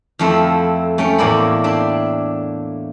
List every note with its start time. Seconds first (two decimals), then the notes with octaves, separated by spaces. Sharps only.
0.19 F2 F3 A3 C4 E4
0.98 A3 C#4 G5
1.18 E2 A2 A#3 E4 D5 B5
1.64 D4 E5 G5 C6